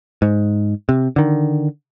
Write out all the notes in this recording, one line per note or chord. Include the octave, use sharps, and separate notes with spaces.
G#2
C3
D3 D#3